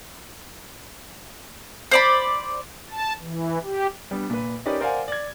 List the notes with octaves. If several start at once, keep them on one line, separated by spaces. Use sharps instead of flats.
C5 D5 B5
A5
E3
G4
G3 B3 D4
A#2 B4
C#4 D#4 G4 A#4 B4 D5
A#4 C5 D5 F5 F#5 G#5
D5 G#6